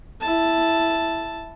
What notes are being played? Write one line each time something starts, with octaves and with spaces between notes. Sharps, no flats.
E4 A5